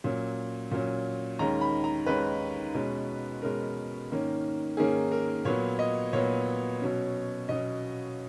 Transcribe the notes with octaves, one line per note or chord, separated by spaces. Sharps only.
A#2 F#3 C#4
A#2 F#3 C#4
D#2 D#3 G#3 C#4 A#5
B5
A#5
D#2 D#3 G#3 C#4 B4
B2 G#3 C#4
B2 G#3 C#4 A#4
G#2 D#3 A#3 C#4
G#2 D#3 A#3 C#4 G#4
A#4
A#2 F#3 B3 C#5
D#5
A#2 F#3 B3 C#5
B2 F#3 C#4
B2 F#3 C#4 D#5